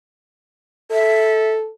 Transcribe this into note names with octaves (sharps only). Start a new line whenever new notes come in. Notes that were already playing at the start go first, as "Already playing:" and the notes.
A4 E5